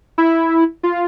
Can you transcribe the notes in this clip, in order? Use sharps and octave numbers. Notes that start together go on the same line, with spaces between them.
E4
F4